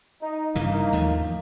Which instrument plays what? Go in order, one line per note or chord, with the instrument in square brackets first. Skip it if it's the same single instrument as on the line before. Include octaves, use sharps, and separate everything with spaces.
[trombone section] D#4
[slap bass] G2 C#3 E3 [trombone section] A#3 D#4
[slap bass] D#2 F3 A3